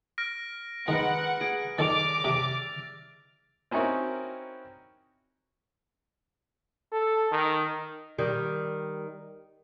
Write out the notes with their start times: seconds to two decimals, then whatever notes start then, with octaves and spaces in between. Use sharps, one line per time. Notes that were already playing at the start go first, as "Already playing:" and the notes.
0.18 F6 A#6 D7
0.88 D#3 G#3 A#4 B4 F#5
1.41 G#4 D7
1.79 D#3 A4 D5 D6 A6 F7
2.24 C3 E5 A5
3.71 C4 C#4 D#4 E4 F#4 A#4
6.92 A4
7.32 D#3
8.18 D#3 G3